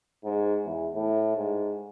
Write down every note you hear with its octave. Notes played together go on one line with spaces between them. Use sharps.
G#2
E2
A2
G#2